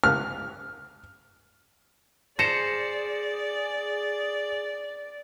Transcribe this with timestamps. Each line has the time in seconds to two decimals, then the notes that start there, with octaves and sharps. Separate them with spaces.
0.04 F6
2.39 G#4 C5 D5 A#6 C#7 E7